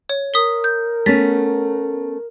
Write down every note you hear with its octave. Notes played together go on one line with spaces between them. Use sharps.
C#5
A#4 D#6 B6 G7
G6
A3 B3 C#4 A6 B6